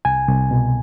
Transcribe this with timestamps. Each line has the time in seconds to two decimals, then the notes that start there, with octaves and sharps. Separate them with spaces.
0.05 C2 G#5
0.28 C2
0.51 B2